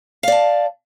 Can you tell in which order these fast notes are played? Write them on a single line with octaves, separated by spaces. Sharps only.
F5 D5 A5